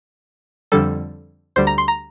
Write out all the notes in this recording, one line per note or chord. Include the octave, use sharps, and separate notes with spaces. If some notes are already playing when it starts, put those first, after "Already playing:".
F2 D3 G3 A4
D2 D3 G3 C5
A#5
C6
A#5